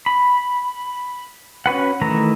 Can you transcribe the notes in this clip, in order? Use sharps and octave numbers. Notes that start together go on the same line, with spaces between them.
B5
C#4 F#4 B4 F#5
D#3 E3 A3 E4 A#5